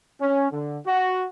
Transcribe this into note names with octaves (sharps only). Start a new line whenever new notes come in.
C#4
D3
F#4